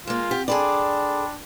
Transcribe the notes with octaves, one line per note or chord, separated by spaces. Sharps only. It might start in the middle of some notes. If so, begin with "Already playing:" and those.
G#3 A#3 F4
C4 G4 F#5
D4 G#4 A4 D5 G5 B5 C6